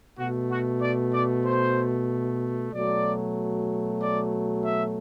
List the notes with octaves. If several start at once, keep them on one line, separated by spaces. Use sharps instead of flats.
B2 A3 F#4
F#4
D5
D5
C5
B2 F#3 A3 D5
D5
E5